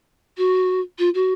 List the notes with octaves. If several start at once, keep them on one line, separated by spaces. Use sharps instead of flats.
F#4
F4
F#4